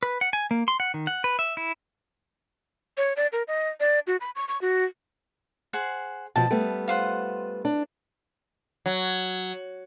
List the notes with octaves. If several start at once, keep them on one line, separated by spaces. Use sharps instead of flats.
B4
F#5
G#5
A#3
C6
F#5
D#3
F#5
B4
E5
E4
C#5
D5
A#4
D#5
D5
F#4
B5
C#6
C#6
F#4
G#4 C5 F#5
B2 F3 A5
G3 A3 B3
F4 C5 F#5
D4
F#3